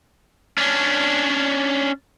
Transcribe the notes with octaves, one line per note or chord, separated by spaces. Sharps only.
C#4 D4